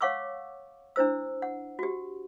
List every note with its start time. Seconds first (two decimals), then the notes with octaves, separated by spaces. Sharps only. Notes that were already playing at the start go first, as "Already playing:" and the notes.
0.01 C#5 F5 F#5 C#6 D6 E6
0.96 D4 E4 C5 E6
1.42 F#5
1.79 F#4 G4